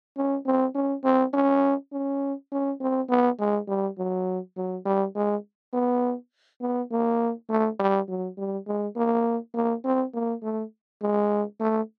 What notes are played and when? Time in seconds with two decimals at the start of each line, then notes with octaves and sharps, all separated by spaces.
0.17 C#4
0.46 C4
0.75 C#4
1.04 C4
1.33 C#4
1.92 C#4
2.52 C#4
2.81 C4
3.09 B3
3.39 G#3
3.68 G3
3.98 F#3
4.57 F#3
4.85 G3
5.15 G#3
5.73 B3
6.61 B3
6.91 A#3
7.49 A3
7.79 G3
8.09 F#3
8.37 G3
8.67 G#3
8.96 A#3
9.54 A#3
9.84 C4
10.14 A#3
10.43 A3
11.02 G#3
11.60 A3